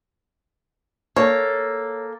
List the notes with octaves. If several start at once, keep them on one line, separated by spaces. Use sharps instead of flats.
A#3 A4 C#5